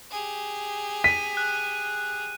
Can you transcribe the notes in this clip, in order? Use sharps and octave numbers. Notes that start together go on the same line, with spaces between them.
G4 G#4
B6 D#7
F#6